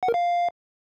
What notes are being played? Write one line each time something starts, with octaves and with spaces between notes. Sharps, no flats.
F#5
A#4
F5